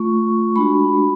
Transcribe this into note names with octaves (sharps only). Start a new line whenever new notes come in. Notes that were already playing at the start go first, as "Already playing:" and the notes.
Already playing: A3 F4 C#6
G#3 D4 F#4 B5